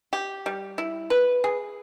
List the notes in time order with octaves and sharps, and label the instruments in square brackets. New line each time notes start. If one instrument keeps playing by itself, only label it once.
[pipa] G4
G3
E4
B4
G#4